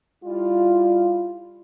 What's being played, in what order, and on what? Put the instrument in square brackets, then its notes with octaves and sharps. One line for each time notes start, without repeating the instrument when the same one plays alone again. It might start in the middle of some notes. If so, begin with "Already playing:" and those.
[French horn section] G3 E4 F4